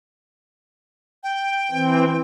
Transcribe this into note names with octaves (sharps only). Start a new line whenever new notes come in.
G5
E3 C4